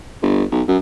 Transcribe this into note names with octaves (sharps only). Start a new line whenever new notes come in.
G1
B1
F#2